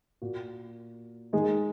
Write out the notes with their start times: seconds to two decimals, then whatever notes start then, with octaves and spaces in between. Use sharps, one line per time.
0.22 A#2 A#3 F#4
1.33 D#3 G#3 D#4 G#4